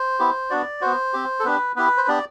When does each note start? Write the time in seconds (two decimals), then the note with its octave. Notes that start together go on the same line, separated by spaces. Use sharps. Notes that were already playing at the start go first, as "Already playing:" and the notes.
Already playing: C5
0.19 B3 E4 G4
0.50 B3 D4 F#4 D5
0.81 B3 F#4 C5
1.13 C4 G4
1.40 A4
1.44 B3 D4 G4 B4
1.76 B3 E4 G4 B4
1.97 C5
2.08 B3 D4 G4 D5